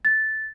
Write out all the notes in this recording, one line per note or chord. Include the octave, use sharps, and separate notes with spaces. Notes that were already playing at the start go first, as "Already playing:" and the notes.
A6